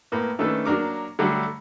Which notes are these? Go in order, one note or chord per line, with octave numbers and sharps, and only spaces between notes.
A2 A#3 B3
D#3 A3 C#4 D4 A4 B4
F#3 A#3 D4 A#4 D6
D3 F#3 G3 A3 D4 A4